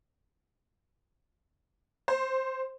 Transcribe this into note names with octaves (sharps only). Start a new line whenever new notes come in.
C5